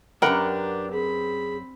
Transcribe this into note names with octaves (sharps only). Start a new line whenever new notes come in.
F#2 A#3 D4 G4 A#4 B4 F#5 G5
C4 G#4 B5